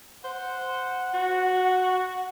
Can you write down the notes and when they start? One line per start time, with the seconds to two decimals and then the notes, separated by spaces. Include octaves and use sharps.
0.24 C5 F#5
1.14 F#4